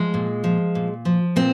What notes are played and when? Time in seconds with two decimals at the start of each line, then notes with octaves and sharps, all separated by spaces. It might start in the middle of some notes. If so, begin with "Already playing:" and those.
Already playing: F3 G#3
0.14 A#2
0.44 F3
0.75 A#2
1.05 F3
1.36 A#2 C4